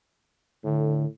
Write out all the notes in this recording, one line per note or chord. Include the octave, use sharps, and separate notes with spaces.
A2 D3